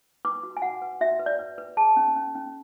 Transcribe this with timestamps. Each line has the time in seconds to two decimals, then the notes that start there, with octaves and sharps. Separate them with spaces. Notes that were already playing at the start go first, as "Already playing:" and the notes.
0.25 B4 D6
0.43 F#4
0.57 G#5
0.62 F#4 F#5
0.82 B4
1.01 F#4 E5
1.19 B4
1.26 D5
1.39 B4
1.58 B4
1.77 G#4 A5
1.97 C#4
2.16 C#4
2.35 C#4